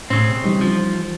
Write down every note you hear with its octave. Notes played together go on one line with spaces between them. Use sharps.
A2 C#3 C4 E6
B2
E3 G3 D#4
F3